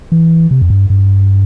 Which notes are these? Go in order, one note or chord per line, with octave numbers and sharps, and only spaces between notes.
E3
C3
F2
G2
G2